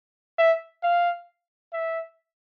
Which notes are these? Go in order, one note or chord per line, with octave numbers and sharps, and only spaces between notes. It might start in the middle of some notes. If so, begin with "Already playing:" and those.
E5
F5
E5